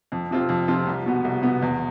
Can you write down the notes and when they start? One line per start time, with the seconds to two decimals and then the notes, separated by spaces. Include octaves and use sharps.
0.12 F2
0.31 C3 F3 C4 F4
0.49 F2
0.68 C3 F3 C4 F4
0.87 C2
1.06 B2 B3
1.25 C2
1.43 B2 B3
1.62 E2